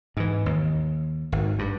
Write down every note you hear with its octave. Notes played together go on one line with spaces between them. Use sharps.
G#2 E3
D#2
G#1 D#3
G2